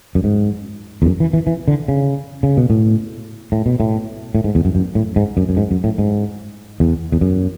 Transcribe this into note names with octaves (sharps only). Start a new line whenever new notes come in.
F#2
G#2
E2
F#2
E3
E3
E3
D3
C#3
C#3
B2
A2
A2
B2
A2
A2
G#2
E2
F#2
F#2
A2
G#2
F#2
F#2
G#2
F#2
A2
G#2
E2
E2
F#2